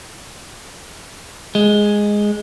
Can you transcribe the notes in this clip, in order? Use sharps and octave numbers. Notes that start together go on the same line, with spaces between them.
G#3